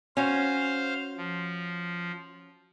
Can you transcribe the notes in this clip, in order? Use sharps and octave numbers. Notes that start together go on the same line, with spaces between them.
C#4 F#4 C5 F5
F3